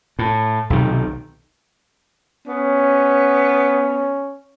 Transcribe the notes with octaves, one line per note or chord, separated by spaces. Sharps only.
A2
B1 C3 D#3
B3 C#4